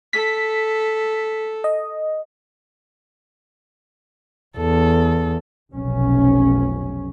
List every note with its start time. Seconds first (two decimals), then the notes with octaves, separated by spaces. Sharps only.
0.13 A4 B6
1.64 D#5
4.57 E2 A4
5.73 F1 B1 C#4